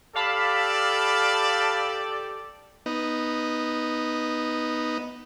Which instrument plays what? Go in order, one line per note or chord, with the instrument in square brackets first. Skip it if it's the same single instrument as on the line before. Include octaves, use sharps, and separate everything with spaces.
[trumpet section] G4 A4 D5 [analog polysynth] F5 A5 B5
[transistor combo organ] B3 D#4